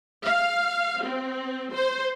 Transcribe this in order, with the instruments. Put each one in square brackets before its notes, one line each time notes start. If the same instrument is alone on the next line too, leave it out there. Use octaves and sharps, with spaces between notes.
[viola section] F5
C4
C5